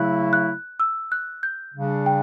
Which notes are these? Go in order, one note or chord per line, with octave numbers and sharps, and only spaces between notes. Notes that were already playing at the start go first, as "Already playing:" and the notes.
Already playing: C#3 F#3 A3 E4 F#6
F#6
E6
F#6
G6
C#3 G3 D4
G5